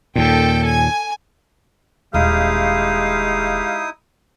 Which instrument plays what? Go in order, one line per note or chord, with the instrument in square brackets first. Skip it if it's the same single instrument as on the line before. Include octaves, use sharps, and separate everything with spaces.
[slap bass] D#2 A#2 [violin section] A4 G5
[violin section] G#5
[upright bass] D#1 [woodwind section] G#3 G4 F5 [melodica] D#4 E4 D#6